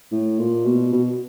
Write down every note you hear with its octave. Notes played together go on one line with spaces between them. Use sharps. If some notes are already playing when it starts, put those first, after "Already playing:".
A2
A#2
B2
B2